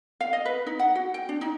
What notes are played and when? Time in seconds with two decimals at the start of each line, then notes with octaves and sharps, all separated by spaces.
0.21 F5
0.33 D#5
0.45 B4
0.67 D#4
0.79 F#5
0.95 F#4
1.14 G5
1.29 D4
1.41 D#4